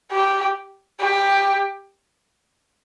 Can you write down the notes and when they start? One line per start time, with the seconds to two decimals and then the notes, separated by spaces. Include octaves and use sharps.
0.12 G4
1.00 G4